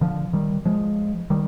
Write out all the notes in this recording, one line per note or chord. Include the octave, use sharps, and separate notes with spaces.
D3 F3
D#3 G3
F3 G#3
D#3 G3